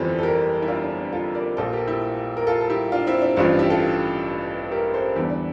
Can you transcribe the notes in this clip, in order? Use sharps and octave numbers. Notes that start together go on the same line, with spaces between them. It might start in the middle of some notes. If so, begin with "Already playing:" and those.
Already playing: G1 F2 E3 G3 A4 C5
A4
G4 A#4
E4
D4 F4
D4
D4
F4 A4
A#4 D5
A#1 A#2 F3 A4 C5
G4 A#4
E4 G4
A#4
F4 A4
A4
E4 G4
D4 F4
C4 E4
D4
A1 G2 F3 D4 F4
E4 G4
F4 A4
G4 A#4
A4 C5
E2 D3 G3 E4
D4